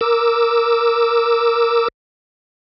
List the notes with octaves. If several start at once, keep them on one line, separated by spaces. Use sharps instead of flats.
A#4 D6 E6